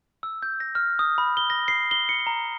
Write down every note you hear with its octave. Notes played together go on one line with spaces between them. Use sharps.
E6
G6
A#6
F6
D#6
B5
G7
A#6
C7
G7
C#7
A#5